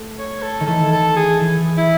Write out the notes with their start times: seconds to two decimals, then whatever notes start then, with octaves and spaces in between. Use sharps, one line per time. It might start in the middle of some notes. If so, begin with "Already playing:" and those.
Already playing: A3
0.19 C#5
0.42 A4
0.60 D#3
0.67 E3 A4
0.92 A4
1.16 G#4
1.41 E3
1.77 E4